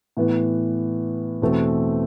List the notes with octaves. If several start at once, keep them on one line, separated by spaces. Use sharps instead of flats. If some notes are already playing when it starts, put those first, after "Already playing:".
A2 E3 B3
E2 B2 A3 C4